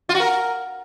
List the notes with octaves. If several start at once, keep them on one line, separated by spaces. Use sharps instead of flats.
F4
F#4
A#4